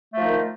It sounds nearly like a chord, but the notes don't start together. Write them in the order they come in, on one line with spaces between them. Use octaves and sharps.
A3 F3 D#4 D#3